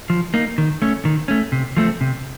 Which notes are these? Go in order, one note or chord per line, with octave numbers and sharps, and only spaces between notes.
F3
A#3 D#4
D#3
A3 C#4
D#3
A3 C#4
C3
F3 A3 C4
C3